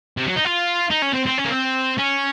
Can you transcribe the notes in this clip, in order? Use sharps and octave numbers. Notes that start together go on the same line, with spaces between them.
C3
F#3
D#4
F4
D#4
C#4
C4
C4
C#4
A#3
C4
C#4